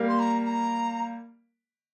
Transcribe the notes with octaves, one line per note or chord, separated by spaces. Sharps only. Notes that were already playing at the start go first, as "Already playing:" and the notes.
Already playing: G3 A#3
C6
A#5
A#5